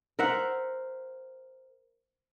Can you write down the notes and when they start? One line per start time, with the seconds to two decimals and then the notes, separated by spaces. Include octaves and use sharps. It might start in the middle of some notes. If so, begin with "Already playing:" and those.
0.19 A#4 C5 E5 F#5